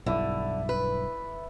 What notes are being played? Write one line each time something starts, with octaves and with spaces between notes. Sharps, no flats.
B1 G2 D3 E4 D5
B4